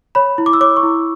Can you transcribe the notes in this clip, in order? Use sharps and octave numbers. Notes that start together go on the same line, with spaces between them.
C#5 B5
E4
D6
E6
C#5 D6
C#6
E4